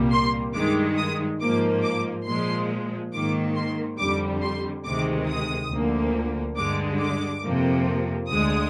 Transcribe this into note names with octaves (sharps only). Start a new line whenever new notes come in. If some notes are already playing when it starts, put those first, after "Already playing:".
Already playing: C2 A#2 G3 A#3
C6
G2 D#3 G#3 D6
D#6
G#2 F3 A#3 D6
D6
A#2 F3 G#3 C6
G#2 D#3 A#3 D6
C6
F2 D3 G3 D6
C6
D2 C3 D#3 G#3 D6
D#6
D2 D3 F3 A#3
G2 D3 G#3 D6
D6
F2 C3 F3 A#3
D2 D3 G#3 D#6